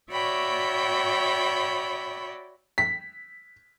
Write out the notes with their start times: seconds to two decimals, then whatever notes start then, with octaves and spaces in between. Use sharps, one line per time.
0.12 F#4 C#5 D5 E5 G5 B5
2.78 B6